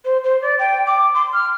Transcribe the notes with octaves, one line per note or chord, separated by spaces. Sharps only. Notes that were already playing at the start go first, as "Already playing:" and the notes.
C5
C5
D5
G5
D6
C6
F6